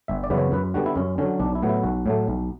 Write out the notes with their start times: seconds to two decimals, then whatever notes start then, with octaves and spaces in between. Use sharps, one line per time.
0.08 G1 E5
0.24 D5
0.30 F#2 C#3 E3 B3
0.38 C#5
0.52 F#2 B4
0.74 D3 G3 B3 F#4
0.86 E4
0.96 F#2 C#4
1.18 D3 F#3 C#4
1.40 B1 D4
1.55 E4
1.63 A2 F#3 B3
1.69 E4
1.83 B1 F#4
2.06 A2 F#3 A3
2.28 B1